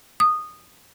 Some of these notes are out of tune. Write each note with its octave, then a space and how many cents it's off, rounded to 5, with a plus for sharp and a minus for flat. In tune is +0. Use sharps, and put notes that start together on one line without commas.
D#6 -15